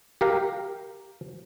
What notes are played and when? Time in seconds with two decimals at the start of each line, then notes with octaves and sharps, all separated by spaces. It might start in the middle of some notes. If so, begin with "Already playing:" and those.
0.21 G4 A#4 F5